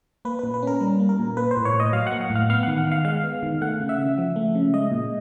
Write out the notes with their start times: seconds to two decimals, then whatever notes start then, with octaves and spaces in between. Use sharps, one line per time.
0.25 A#3 B4
0.39 A#2 B4
0.54 B4
0.62 C#4 A#4
0.81 G3
1.00 A#3
1.09 A#4
1.19 A#2
1.37 A#3 B4
1.51 C5
1.57 A2
1.65 C#5
1.74 A2
1.80 D#5
1.93 F#3 F5
2.07 A#3 F#5
2.21 F#5
2.30 A2
2.36 F5
2.50 B3 F5
2.63 D#3 F#5
2.78 F#5
2.87 D#3 F5
3.05 G#3 F5
3.24 B3
3.43 D#3
3.61 A3 F#5
3.80 C#3
3.89 E5
3.98 C#3
4.18 F3
4.36 A3
4.55 C#3
4.74 G#3 D#5
4.91 A#2